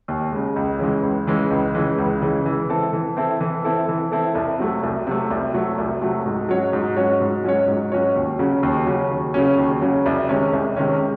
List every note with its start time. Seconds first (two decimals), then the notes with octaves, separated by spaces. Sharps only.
0.08 D#2
0.32 C#3 G#3
0.56 C#2
0.79 C#3 E3 G#3
1.03 C#2
1.27 C#3 E3 G#3
1.51 C#2
1.74 C#3 E3 G#3
1.98 C#2
2.22 C#3 E3 G#3
2.46 E3
2.69 C4 E4 A4
2.93 E3
3.17 C4 E4 A4
3.40 E3
3.64 C4 E4 A4
3.88 E3
4.12 C4 E4 A4
4.35 C2
4.59 C3 F#3 A3
4.83 C2
5.07 C3 F#3 A3
5.31 C2
5.54 C3 F#3 A3
5.78 C2
6.02 C3 F#3 A3
6.26 G#2
6.49 F#3 C#4 F#4 C#5
6.73 G#2
6.96 F#3 C#4 F#4 C#5
7.21 G#2
7.44 F#3 C#4 F#4 C#5
7.68 G#2
7.92 F#3 C#4 F#4 C#5
8.16 D#2
8.39 C#3 F#3 C#4
8.63 D#2
8.86 C#3 F#3 C#4
9.11 D#2
9.34 C#3 F#3 C#4
9.58 D#2
9.81 C#3 F#3 C#4
10.06 C2
10.29 C3 D#3 G#3 C#4
10.53 C2
10.76 C3 D#3 G#3 C#4